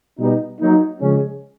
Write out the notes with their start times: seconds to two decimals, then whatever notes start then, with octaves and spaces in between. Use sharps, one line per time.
0.18 B2 G3 B3 D#4
0.60 F#3 A#3 D#4
1.01 C#3 F3 G#3 C#4